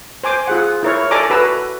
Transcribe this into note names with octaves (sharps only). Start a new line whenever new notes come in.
C5 G#5 D6
F4 G#4 F#5
E4 A#4 C#5
A4 D5 G#5 A#5 D6
F#4 A4 B4 A#5 E6